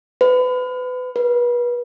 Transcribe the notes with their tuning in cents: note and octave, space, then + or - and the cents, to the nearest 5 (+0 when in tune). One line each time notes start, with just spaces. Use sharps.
B4 +30
B4 -35